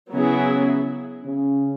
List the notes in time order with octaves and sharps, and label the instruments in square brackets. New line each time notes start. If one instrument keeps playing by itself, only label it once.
[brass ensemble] C#3 C#4 [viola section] F#3 B3 E4 G#4
[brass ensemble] C#3 C#4